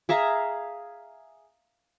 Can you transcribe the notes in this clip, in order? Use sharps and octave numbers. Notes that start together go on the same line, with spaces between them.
G#4 E5 F5 A#5